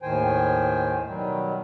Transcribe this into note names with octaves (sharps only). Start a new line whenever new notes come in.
D#2 A2 D#3 C5 G5 G#5
B2 D#3 F#3 G3